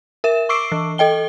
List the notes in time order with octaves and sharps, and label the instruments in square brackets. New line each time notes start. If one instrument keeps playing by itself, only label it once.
[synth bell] A#4 E5 E7
C#6 D6 E6 C7 D7
E3
A4 D#5 G5 G7